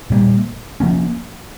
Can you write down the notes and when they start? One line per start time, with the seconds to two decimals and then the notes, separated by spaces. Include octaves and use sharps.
0.10 A#2 G3 A#3
0.80 F3 A#3 C#4